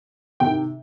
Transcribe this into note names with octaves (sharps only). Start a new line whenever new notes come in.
C3 D#3 G5